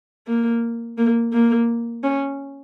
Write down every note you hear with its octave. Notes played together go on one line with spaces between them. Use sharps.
A#3
A#3
A#3
C#4